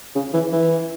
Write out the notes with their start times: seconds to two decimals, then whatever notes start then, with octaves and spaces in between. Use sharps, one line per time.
0.15 C#3
0.34 E3
0.53 E3